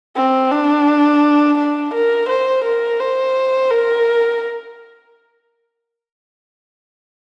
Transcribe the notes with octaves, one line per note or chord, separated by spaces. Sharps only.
C4
D4
D4
A#4
C5
A#4
C5
A#4